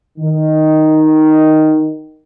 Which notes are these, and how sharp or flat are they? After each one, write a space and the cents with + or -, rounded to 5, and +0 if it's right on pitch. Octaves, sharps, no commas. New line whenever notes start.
D#3 +0